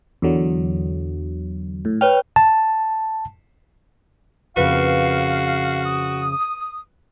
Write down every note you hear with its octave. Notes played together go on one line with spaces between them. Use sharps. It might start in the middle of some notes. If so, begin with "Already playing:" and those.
E2 D3 F#3
A2
B4 C#5 G5 F6
A5
F2 C#3 A#3 F#4 B4 F5
D#6